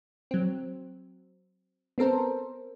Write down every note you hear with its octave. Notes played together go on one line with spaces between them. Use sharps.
F#3 C4
B3 C4 A4 A#4 C5